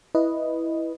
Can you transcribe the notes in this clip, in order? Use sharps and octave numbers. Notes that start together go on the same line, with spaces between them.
E4 B4 D#5